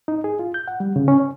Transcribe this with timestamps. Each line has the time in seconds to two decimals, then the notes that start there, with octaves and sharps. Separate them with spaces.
0.08 D#4
0.24 G#4
0.39 F4
0.54 G6
0.68 F#5
0.80 G3
0.96 C#3
1.08 C#4
1.20 C#5